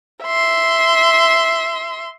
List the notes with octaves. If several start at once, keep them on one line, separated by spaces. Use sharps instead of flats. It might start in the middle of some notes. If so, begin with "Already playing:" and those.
E5 C6